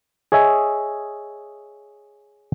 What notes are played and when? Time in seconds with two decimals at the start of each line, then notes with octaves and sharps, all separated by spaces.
0.32 G#4 C#5 D#5 E5 G#5